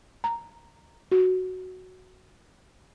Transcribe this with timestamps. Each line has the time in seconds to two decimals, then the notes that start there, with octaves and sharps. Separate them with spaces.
0.24 A#5
1.12 F#4